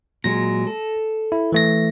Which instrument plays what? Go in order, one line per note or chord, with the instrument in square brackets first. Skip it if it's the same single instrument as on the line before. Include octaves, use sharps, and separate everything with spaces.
[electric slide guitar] A#2 F#3 G#3 [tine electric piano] A#6
[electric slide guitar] A4
[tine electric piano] E4
E3 A3 A#6